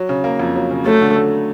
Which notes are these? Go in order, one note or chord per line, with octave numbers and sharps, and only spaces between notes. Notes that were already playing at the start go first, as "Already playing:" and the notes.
Already playing: F#3
C#3
A#3
F2
F#3
C#3
F#3 A3
D3
A3